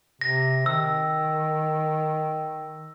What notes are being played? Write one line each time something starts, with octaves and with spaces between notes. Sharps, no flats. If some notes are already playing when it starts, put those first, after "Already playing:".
C3 A#6
D#3 E6